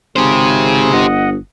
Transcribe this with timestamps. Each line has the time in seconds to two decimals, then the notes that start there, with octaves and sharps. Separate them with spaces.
0.16 G#1 C#3 G4 G#4 C5
0.92 G1 D#5 F#5